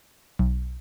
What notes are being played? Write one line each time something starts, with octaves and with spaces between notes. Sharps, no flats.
B1